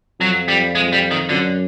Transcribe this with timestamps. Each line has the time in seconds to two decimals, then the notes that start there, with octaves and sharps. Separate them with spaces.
0.20 F2 F#3
0.48 G3
0.75 G#3
0.93 G3
1.11 D#3
1.29 F#2 D3